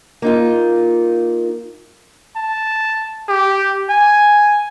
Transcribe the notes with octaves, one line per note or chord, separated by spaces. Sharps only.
A#3 D#4 F4
A5
G4
G#5